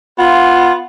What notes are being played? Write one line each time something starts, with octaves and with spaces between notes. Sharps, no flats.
B3 F4